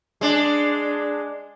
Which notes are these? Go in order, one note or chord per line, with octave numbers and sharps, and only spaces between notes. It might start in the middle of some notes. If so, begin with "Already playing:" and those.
G#3 D4